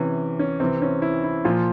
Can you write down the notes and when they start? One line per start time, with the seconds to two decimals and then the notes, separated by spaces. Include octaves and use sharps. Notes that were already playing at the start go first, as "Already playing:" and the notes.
Already playing: C3 E3 C#4
0.39 C#4
0.60 C3 E3 C4
0.82 C#4
1.02 E4
1.24 E4
1.45 A#2 F3 F4